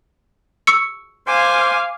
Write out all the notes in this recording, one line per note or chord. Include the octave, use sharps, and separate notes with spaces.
C#6 E6 C#7
C5 F5 G#5 D6